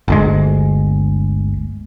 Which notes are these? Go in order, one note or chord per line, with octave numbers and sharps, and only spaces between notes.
G1 D2 G#3